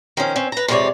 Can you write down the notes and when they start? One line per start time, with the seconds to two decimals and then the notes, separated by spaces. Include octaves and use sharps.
0.17 D#3 F3 C#4
0.36 C4 C#4
0.52 B4 A#5
0.68 F2 G#2 C3 E4 C#5 D5